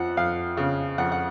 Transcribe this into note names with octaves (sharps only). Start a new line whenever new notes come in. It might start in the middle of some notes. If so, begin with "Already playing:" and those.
Already playing: F2 F3 F#5
F2 F5
C#3
F2 F#5
F#5